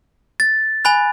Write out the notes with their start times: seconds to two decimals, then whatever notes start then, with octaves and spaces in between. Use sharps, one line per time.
0.40 A6
0.85 G#5 B5 F#6